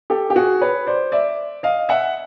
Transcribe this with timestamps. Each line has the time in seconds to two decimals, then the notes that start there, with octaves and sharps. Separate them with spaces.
0.10 G4 A4
0.30 G4
0.36 F#4 G#4
0.61 B4 C#5
0.87 C5 D5
1.12 D5 E5
1.63 D#5 F5
1.89 E5 F#5